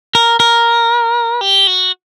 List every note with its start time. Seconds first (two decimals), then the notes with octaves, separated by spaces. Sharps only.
0.15 A#4
0.40 A#4
1.41 G4
1.67 F#4